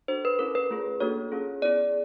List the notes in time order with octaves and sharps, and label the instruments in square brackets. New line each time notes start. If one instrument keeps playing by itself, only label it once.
[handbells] D4 F#4 A4 C5
B4
C#4 E4 A4 A#4
B4
A3 C#4 F4 G#4
A#3 D4 F#4 A4 C#5
C#4 F4 G#4
B3 E4 G#4 D5